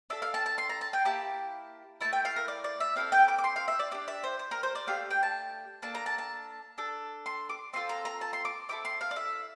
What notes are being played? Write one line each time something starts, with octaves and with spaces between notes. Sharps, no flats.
D4 A4 E5
F5
A5
A5
C6
A#5
A5
G5
A#3 E4 G4 A5
A3 C4 E4 A5
G5
F5
A#4
D5
D5
E5
C4 E4 A4 F5
G5
D6
D6
C6
F5
E5
D5
D4 G4 D5
E5
C5
C5
A#4
C5
D5
A3 D4 G4 F5
G5
A5
A#3 D4 A4 A5
A#5
A5
A5
D4 A4
C6
D6
C4 F4 A4 C6
A#5
A#5
A5
C6
D6
C4 E4 A4 D6
C6
F5
D5
E5